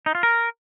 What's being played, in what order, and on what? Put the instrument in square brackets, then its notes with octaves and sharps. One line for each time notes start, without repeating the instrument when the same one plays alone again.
[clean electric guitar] D#4
F4
A#4